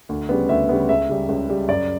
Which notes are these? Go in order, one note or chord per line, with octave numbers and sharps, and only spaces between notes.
D2
C#3 G3 B3
D2 E5
C#3 G3 B3
C#2 E5
C#3 G3
C#2
C#3 G3
F#2 D5